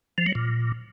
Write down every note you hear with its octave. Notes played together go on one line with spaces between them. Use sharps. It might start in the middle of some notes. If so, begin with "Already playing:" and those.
F3
F#3
A#2